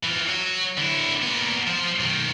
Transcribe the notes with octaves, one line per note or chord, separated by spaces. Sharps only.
E3 F4
F#3 F#4
D3 E4
A#2 B3
F3 C5
B1 D#3